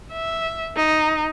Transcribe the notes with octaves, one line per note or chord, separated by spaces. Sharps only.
E5
D#4